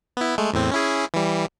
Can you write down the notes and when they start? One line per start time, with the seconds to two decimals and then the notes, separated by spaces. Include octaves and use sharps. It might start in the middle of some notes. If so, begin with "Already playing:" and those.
0.17 B3 E4
0.38 G#3 A3
0.53 E2 A2 C4
0.71 C#4 E4 G#4
1.14 E3 G3